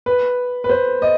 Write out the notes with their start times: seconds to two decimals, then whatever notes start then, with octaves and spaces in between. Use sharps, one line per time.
0.06 B4
0.64 B4
0.69 C5
1.02 D#5